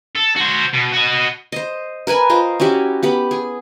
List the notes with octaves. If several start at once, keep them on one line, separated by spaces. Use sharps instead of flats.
A4
F#4 C5
B2
F#4 D#5
C5 D#5
A#4 B4 G#5 B5
F4 C5 D#5
C#4 E4 F#4 G4
B3 G4 B5
G#4